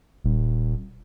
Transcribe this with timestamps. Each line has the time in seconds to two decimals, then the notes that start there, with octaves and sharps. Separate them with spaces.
0.24 D#1